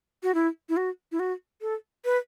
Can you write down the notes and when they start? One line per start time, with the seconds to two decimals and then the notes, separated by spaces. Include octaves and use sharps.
0.23 F#4
0.34 E4
0.69 E4
0.77 F#4
1.12 E4
1.19 F#4
1.61 A4
2.05 B4